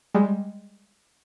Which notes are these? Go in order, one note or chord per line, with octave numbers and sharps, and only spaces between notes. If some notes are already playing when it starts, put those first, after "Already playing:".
G3 G#3